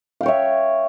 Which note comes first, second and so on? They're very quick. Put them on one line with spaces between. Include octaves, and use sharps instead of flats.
F5 G5 C#5 E5